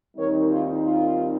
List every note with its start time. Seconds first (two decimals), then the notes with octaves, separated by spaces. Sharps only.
0.15 D#2 D#3 G3 C4 D#4 A#4 C#5
0.49 F4
0.84 F4